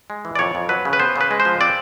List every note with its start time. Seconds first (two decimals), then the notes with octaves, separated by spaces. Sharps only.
0.10 G#3
0.25 E3
0.35 D5
0.39 F2 C#5
0.55 F2
0.69 F#3 B4
0.85 C#3
0.93 B4
0.99 B3 C5
1.16 C#3
1.21 B4
1.31 G#3
1.40 C5
1.45 F3
1.60 C4 D5